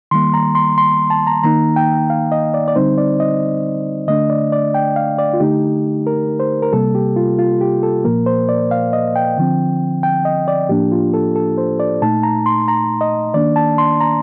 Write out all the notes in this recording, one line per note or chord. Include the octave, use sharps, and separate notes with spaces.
D#3 G3 A#3 C6
A#5
C6
C6
A5
A#5
D#3 A#3 D#4 A#5
G5
F5
D#5
D5
D5
D3 G3 C4 D#4 C5
D5
D#5
D3 A3 D4 D#5
D5
D5
G5
F5
D5
F4
D3 A3 D#4 G4
A#4
C5
A#4
C3 G3 A#3 A4
G4
F4
F4
G4
A4
A#2 F3 A#3 A#4
C5
D5
F5
D#5
G5
D3 F3 C4
G5
D#5
D5
A2 F3 A#3 D4 G4
F4
A4
A4
C5
D5
A#2 A3 D#4 A5
A#5
C6
A#5
D#5
D#3 A#3 D4 D5
A5
C6
A#5